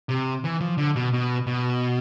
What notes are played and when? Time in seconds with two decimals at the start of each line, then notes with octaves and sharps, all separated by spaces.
0.09 C3
0.44 E3
0.61 F3
0.78 D3
0.96 B2
1.13 B2
1.47 B2